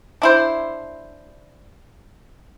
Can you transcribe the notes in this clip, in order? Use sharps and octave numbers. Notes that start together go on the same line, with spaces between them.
D4 E4 C5